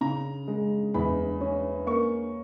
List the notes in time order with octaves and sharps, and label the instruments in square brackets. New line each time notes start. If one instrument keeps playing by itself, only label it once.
[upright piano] C#3 A#5
G#3
E2 B5
C#4
A#3 C#6